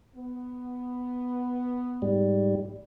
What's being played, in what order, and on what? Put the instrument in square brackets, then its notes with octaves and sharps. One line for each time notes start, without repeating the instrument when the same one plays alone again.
[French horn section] B3
[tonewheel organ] G#2 G3